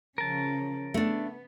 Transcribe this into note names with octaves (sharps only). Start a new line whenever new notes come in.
C#3 F3 C#4 A#4 A5
A3 B3 D4